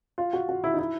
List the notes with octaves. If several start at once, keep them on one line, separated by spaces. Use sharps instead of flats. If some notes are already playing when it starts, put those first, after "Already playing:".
F4
F#4
F#4
E4
D#4
E4